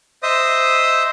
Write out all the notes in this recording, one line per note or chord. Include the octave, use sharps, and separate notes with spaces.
C5 D#5 E5 D#6